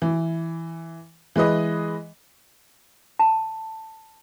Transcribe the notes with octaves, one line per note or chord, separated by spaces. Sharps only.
E3
E3 G#3 B4 D#5
A5